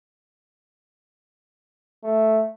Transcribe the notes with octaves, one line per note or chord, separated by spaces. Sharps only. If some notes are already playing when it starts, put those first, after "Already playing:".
A3